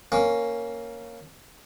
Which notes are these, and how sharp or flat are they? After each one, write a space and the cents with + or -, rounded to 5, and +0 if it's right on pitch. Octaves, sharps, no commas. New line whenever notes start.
A#3 +0 C#4 +0 D6 -30